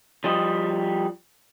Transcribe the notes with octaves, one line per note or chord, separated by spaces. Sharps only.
F3 G3 D#5